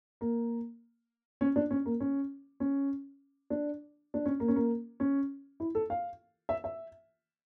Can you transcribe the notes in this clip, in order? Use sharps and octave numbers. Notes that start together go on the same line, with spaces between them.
A#3
C#4
D4
C#4
A#3
C#4
C#4
D4
D4
C#4
A#3
C#4
A#3
C#4
E4
A4
F5
E5
E5